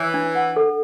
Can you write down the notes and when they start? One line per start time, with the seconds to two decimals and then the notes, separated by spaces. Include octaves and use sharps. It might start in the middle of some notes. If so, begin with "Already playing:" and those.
Already playing: E3 C#5
0.14 D4
0.35 F#5
0.56 A4